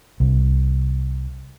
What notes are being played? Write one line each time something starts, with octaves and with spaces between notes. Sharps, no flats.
C2